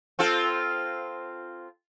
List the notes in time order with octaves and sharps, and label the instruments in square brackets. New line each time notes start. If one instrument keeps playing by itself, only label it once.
[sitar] C4 F4 A4